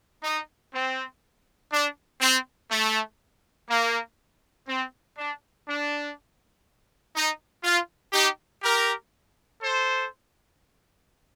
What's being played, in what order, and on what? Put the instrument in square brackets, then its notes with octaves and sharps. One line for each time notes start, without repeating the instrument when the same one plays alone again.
[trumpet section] D#4
C4
D4
C4
A3
A#3
C4
D4
D4
D#4
F4
D#4 G4
G4 A#4
A4 C5